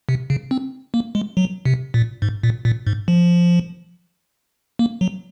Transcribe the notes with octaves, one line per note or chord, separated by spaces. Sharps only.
C3
C#3
C4
A#3
G#3
F#3
C3
A#2
G#2
A#2
A#2
G#2
F3
A#3
F#3